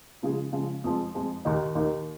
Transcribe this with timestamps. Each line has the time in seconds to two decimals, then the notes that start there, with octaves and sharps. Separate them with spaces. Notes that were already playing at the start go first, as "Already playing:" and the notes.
0.23 C#3 F3 G#3 F4 G#4
0.53 C#3 F3 G#3 F4 G#4
0.84 F2 F3 G#3
1.14 F2 F3 G#3
1.45 D#2 D#3 A#3 D#4
1.75 D#2 D#3 A#3 D#4